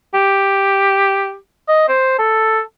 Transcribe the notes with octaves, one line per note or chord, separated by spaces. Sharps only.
G4
D#5
C5
A4